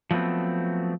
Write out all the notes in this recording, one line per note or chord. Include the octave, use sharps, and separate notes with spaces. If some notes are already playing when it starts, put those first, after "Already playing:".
F3 F#3 A3 B3 C4